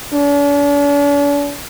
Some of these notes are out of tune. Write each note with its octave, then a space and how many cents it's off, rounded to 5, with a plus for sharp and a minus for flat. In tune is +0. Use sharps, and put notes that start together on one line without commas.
D4 -45